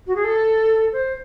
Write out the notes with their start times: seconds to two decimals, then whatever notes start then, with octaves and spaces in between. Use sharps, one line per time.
0.06 F#4
0.15 G#4
0.24 A4
0.92 C5